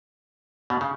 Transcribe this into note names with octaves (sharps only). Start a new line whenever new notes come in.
B2
C#3